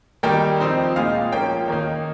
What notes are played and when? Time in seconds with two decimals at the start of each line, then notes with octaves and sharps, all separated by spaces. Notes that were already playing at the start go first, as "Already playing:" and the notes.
0.23 D#3 G3 A#3 D#4 G5
0.60 F3 C4 D#4
0.96 A#2 G#3 D#4 F5
1.32 F3 A#3 C#4 G5
1.68 D#3 A#3 D#4